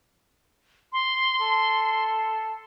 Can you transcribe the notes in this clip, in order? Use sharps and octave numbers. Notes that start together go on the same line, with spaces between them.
C6
A4